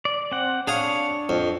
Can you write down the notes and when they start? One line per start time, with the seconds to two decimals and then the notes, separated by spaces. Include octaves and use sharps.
0.05 D5
0.32 C4 F#5
0.67 D4 G#4 C#5 F5 D#6
1.29 F2